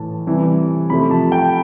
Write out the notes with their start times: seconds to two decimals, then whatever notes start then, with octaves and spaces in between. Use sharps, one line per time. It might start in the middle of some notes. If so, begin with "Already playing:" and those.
Already playing: A2 E3 A3 A5
0.27 C3 E3 G3
0.90 C3 F3 A3 B5
1.11 A5
1.32 G5